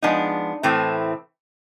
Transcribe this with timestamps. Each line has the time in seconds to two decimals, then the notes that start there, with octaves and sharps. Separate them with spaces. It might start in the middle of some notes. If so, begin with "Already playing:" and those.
0.02 F3 G#3 B3 D4 D#4
0.63 A2 E3 A3 C4